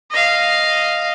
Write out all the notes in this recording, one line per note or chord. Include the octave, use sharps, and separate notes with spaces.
D#5 F5